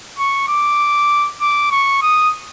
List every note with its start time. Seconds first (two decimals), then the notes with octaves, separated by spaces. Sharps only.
0.19 C#6
0.48 D6
1.41 D6
1.72 C#6
2.02 D#6